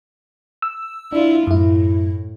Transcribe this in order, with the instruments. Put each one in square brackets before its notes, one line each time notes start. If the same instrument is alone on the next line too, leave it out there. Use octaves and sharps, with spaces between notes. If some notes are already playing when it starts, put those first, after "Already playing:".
[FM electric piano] E6
[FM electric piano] D4 [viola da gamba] E4 F4
[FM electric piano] F#2 E4 [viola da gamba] A2